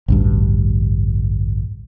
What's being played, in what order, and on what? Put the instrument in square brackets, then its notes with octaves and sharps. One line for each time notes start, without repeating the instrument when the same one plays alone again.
[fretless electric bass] A1 D2 G2